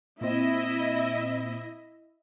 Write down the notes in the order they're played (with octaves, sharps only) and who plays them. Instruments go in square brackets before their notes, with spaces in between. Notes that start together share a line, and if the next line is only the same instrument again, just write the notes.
[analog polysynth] A#2 C4 [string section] E4 D#5 E5